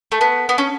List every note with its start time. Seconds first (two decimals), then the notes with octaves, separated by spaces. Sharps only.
0.12 A3
0.21 B3
0.49 B3
0.58 C#4